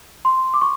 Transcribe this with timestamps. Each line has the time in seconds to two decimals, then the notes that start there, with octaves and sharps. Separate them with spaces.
0.25 C6
0.54 D6
0.62 C#6